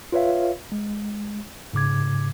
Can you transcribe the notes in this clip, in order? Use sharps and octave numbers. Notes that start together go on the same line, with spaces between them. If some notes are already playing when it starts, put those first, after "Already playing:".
F4 B4 C#5 E5 F5
G#3
G#2 C#3 D6 G#6